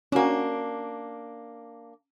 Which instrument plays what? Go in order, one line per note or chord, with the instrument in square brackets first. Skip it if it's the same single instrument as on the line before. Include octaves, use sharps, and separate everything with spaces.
[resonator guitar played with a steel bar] A#3 D4 [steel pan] C#4 F#4